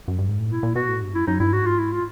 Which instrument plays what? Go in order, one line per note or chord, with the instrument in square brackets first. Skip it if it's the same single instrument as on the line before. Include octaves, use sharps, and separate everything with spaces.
[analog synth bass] F#2
G2
G#2
A2
[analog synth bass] A#2 [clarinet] E4
[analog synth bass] A#2
[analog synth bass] B2 [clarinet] F#4
[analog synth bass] A2
G2
[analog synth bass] F#2 [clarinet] E4
[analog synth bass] F#2 [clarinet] D#4
[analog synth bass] G2 [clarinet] E4
[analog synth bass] G#2 [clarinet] F#4
[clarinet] F4
E4
F4